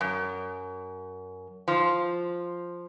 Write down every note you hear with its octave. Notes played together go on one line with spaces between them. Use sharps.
F#2
F3